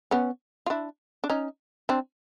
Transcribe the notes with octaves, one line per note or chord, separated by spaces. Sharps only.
B3 C#4
F4
D4 E4
D4
C#4 D#4
C4 D4